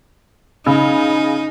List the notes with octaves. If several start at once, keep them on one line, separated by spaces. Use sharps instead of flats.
C#3 D#4